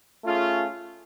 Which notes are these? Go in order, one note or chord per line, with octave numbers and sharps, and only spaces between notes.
A3 C#4 F4 G#4